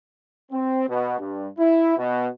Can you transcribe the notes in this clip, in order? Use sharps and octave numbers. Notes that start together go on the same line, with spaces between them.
C4
B2
G2
E4
B2